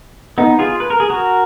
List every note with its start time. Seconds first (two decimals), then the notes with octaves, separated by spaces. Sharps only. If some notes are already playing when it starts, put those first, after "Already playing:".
0.38 B3 D#4
0.59 F4 G#4
0.80 B4
0.90 A#4
1.00 G#4
1.10 F#4 A#4